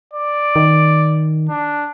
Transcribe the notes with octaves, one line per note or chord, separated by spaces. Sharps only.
D5
D#3
D4